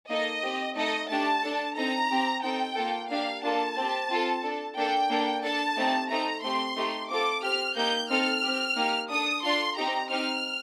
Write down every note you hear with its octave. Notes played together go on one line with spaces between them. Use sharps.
A#3 D#4 A4 D#5
C4 G4
A3 D#4 A4 D#5
A3 D4 G4 A5
D4 A4
C4 D#4 A4 A#5
C4 G4
C4 D#4 A4 G5
A#3 F4 A4
A#3 D4 G4 F5
A#3 D4 F4 A4 A5
C4 G4
C4 F4 A4
D4 A4
A#3 D4 A4 G5
A#3 D4 A4
D4 A4 A5
A3 C4 D#4 G4
A3 C4 D#4 A#5
A3 C4 G4 C6
A3 D#4 G4
C4 F4 A4 D6
C4 G4 F6
A#3 D#4 G4 G6
C4 D#4 A4 F6
C4 G4
A#3 D#4 G4
D4 A4 D#6
D4 F4 A4 C6
C4 D#4 G4 A#5
C4 D#4 G4 F6